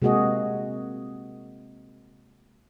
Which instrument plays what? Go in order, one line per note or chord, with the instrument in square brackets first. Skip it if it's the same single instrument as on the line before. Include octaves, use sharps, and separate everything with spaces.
[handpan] C3 G#3 A#3 F#4 G#4 D#5